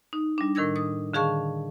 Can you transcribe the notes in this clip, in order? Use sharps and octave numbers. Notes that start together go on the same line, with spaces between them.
D#4
G3 D4
A2 D#3 A#4 E6 G#6 A#6
D#6
D3 D#3 G#4 F5 A5 C#6